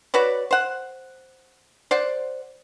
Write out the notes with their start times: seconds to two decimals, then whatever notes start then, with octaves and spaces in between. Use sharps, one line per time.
0.14 F#4 B4 C#5 D5
0.51 C5 F#5
1.91 C5 D5 F#5